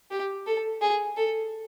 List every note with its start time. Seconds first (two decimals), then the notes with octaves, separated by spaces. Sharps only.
0.11 G4
0.47 A4
0.81 G#4
1.17 A4